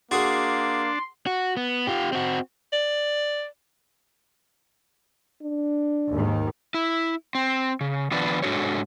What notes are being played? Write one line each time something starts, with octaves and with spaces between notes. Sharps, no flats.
A#3 D4 F#4 G#4 C6
F#4
B3
F4 G4
C4 F#4
D5
D4
D#2 G#2 D#3
E4
C4
C#3
D#3 F3 B3 D4 B4 D5
G#2 D3 D4 F#4 A4 C#5